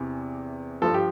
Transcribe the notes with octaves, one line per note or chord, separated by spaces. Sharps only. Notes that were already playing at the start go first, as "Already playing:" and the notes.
Already playing: E2 C3 E3
G2 F3 A4
G4